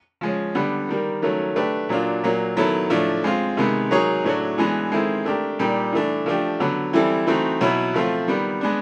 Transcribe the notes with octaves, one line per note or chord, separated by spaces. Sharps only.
F3 G#3 C#4
D3 G3 B3
D#3 G3 A#3
D#3 F#3 A3 C#4
A3 D4 G4 B4
A#2 F#3 A#3 D4 F4
A#2 F#3 A#3
D#3 F#3 B3 E4 A4
A2 F3 A3 D4
G#3 C4 F4
C3 D#3 G#3 B3
F#3 A#3 D#4 G#4 C#5
A2 F#3 A3 D4 F#4
E3 G#3 B3 D4
D#3 G#3 C4 E4 A4
A3 D4 G4 A#4
A#2 G3 A#3 D#4 G4
E3 A3 D4
F3 A3 D4 G4
D3 F#3 B3
E3 G3 C4 E4 A4
E3 A3 C4 D#4 F#4
B2 F#3 B3 E4
F3 A3 C4 F4
D#3 G3 B3
G#3 B3 D4